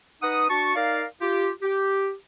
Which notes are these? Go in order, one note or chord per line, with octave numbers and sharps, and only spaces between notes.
D#4 B4 F#5 D#6
D4 F#4 A5 C#6
D#4 A#4 D5 F5
F4 G4
G4